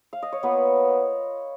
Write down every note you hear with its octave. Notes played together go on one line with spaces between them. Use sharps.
F5
D#5
C#5
A#3 B3 F4 B4